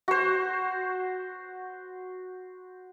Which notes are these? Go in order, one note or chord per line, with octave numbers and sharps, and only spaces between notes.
F#4 C5